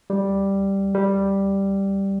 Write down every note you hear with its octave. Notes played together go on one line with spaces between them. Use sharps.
G3
G3